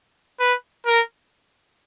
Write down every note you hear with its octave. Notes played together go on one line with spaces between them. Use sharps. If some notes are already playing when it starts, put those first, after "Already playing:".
B4
A#4